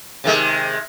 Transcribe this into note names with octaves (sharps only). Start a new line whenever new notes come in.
C3 D#3 G#3